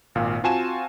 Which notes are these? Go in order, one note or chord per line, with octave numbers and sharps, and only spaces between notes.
G#1 A#2 F5
C4 F4 F#4 G#5 A5 E7